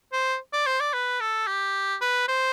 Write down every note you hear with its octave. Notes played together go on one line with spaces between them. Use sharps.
C5
D5
C5
D5
B4
A4
G4
B4
C5